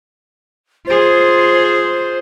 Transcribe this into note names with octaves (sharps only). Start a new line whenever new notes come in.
F4 G#4 C5